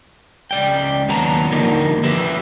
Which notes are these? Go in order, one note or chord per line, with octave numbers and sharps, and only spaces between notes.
C#2 D5 G5
D#2 F#3 B3 A5 A#5
D3 F3 G3 A#3 D#4
F3 E4 G4 B4 E5